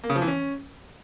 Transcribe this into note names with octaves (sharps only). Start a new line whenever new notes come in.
A#3
C#3
F3
E3
C#4